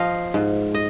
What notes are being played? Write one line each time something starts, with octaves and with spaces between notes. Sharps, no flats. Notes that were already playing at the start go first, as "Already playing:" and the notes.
Already playing: F3 D#5 F5
G#2
D#5